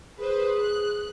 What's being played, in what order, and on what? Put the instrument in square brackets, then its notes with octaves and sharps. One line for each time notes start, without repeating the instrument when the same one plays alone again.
[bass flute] G#4 [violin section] B4 C5
[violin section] F#6